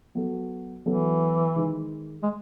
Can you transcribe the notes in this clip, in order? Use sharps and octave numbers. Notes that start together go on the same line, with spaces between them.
F#3 B3 F#4 A4
E3 F#3 B3 F#4 A4
D#3 G#3 D#4 G#4
G#3